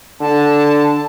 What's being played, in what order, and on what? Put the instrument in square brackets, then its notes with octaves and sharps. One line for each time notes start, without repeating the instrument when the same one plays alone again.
[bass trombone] D3 [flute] A5